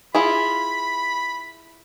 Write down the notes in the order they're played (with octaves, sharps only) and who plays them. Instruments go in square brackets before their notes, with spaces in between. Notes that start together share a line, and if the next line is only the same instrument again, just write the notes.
[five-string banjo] E4 F4 G#4 [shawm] B5